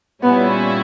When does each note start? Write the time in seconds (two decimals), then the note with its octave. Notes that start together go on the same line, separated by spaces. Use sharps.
0.23 A#2 G3 B3 C#4 E4